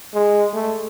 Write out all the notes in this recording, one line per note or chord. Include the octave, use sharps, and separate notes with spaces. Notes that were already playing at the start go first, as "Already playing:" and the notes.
G#3
A3